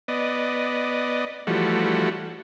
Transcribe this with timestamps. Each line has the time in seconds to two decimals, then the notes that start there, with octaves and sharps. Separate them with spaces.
0.08 B3 D5 D#5
1.47 E3 F3 G3 A3 F#4